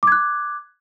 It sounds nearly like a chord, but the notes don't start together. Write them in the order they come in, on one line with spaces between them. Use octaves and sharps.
D6 G#6 F#6